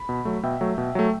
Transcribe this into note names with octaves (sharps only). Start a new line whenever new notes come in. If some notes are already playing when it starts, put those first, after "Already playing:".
Already playing: B5
B2
F#3 A3
B2 E5 G5
F#3 A3
B2
F#3 A3